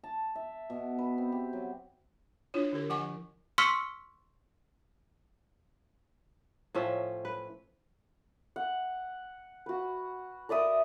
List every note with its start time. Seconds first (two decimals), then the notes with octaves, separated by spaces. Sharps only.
0.03 A5
0.35 E5
0.70 B2
0.98 B4
1.18 C4
1.32 G4
1.53 F#3
2.54 D4 E4 F4 C#5
2.73 D3 G4 A#4
2.90 F3 F#5 G#5 C#6
3.58 C6 C#6 E6 F6 B6 C#7
6.75 A2 F3 C#4 E5
7.25 B4
8.56 F#5
9.66 F#4 B4
10.49 A#4 D5 E5 D#6